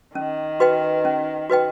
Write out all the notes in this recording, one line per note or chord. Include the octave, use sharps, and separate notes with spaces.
D#3 C#4
F#4 B4 D#5 G5
C#4
F#4 B4 D#5 G5